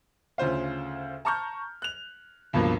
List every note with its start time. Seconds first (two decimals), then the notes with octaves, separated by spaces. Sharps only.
0.38 D2 C#3 F4 C5 F5
1.25 A5 A#5 C#6 F6 G6
1.82 F#6 F7
2.53 C#2 G2 B2 F3 A#3